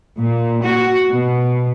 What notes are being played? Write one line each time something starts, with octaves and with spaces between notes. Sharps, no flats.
A#2
F#4
B2